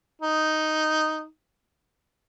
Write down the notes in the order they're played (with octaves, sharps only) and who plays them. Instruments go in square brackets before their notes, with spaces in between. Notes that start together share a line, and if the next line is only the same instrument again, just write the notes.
[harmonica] D#4